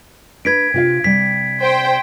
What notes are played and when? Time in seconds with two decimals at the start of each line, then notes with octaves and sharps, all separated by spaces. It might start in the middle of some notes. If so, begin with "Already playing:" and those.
0.45 D4 B4 G#6 B6 D7
0.74 C3 F4 F5
1.04 C3 G3 B6
1.61 C5 G5